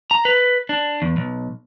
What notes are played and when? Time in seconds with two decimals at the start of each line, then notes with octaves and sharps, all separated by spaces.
0.11 A#5
0.25 B4
0.69 D4
1.02 E2
1.17 B1